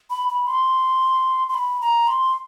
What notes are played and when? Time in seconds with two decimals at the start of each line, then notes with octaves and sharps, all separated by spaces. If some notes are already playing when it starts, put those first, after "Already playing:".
0.10 B5
0.29 B5
0.47 C6
1.49 C6
1.54 B5
1.81 A#5
2.08 C6